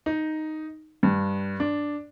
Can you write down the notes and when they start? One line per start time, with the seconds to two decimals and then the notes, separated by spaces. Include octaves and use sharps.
0.06 D#4
1.03 G2
1.60 D4